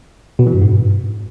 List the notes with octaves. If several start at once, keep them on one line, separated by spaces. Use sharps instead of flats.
B2
E3
G2
G#2